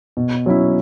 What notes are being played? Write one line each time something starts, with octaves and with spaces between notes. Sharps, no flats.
B2
F#3 C#4 E4